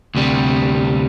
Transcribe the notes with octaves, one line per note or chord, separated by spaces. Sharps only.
D2 C3 G3